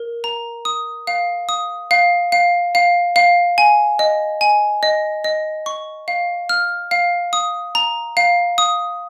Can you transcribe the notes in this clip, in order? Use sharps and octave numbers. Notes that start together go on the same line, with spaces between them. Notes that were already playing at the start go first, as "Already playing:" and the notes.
Already playing: A#4
A#5
D#6
F5
D#6
F5
F5
F5
F5
G#5
D#5
G#5
D#5
D#5
C#6
F5
F6
F5
D#6
A#5
F5
D#6